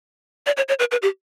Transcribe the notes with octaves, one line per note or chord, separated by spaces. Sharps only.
D5
C#5
C#5
B4
B4
G4